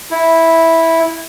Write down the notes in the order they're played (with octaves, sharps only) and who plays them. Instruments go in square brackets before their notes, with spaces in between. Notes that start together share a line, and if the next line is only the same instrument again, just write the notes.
[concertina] E4